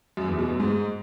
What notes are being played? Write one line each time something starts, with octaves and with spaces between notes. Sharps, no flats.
F#2
E2
B2
F#2
G#2